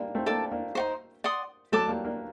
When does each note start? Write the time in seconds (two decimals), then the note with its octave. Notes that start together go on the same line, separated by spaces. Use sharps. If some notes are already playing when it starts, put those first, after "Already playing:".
Already playing: G3 A#3 D4
0.15 A3 C4
0.26 A#3 D4 A4 D5 A5
0.51 A#3 D4
0.75 D#4 F#4 C5
1.24 D5 F#5 C6 D#6
1.72 F#3 A3 A4 D5 A5 D6
1.88 G3 A#3
2.05 A#3 D4